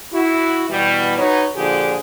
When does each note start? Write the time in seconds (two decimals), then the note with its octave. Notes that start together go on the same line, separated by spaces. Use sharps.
0.13 E4 F#4
0.70 B2 E3 G3
1.18 D#4 F#4 B4 C#5
1.56 A#2 D3 F3 D4 G4 G#4